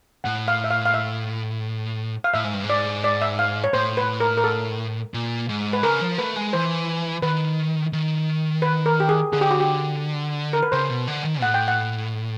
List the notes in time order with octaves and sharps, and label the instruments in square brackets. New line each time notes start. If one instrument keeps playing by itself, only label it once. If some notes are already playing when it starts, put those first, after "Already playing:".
[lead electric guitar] A2 [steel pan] F#5
[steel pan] F5
E5
F5
F5
E5
F5
[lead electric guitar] A2 [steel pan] E5
[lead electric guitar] G#2
G2
G#2
[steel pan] D5
D5
E5
F5
C#5
[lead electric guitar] A2 [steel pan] C5
[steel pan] B4
A#4
A#4
A4
[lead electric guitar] A#2
G#2
[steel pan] B4
[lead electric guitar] C#3 [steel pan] A#4
[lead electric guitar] F3
[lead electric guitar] A3 [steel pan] B4
[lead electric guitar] G#3
[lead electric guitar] E3 [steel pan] C5
[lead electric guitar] D#3 [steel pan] B4
[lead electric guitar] D#3
[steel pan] B4
A#4
G4
G#4
[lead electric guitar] D3 [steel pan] G#4
[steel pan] G4
F#4
G4
A#4
B4
[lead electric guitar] C#3 [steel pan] C5
[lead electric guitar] B2
D3
D#3
[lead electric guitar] A2 [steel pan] F#5
[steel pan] G5
F#5